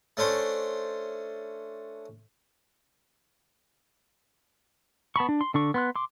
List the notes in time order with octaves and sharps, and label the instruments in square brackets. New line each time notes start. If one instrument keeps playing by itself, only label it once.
[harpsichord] A3 C#4 D4 C5
[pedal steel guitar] B3 A5 B5 C#6
D4
C6
D3 D4 C#6
B3 C6 F#6
C6 D6